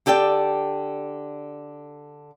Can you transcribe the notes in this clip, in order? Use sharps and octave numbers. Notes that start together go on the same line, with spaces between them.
D3 G4 A4 D5 G5